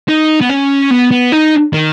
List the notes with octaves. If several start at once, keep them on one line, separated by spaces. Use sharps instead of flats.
D#4
B3
C#4
B3
B3
D#4
D#3